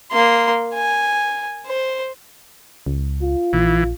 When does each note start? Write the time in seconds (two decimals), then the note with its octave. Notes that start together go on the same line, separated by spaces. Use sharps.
0.12 A#3 C6
0.74 G#5
1.66 C5
2.86 C#2
3.22 F4
3.53 A#1 E3